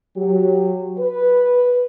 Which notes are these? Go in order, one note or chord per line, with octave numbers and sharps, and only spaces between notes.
F#3 G4
B4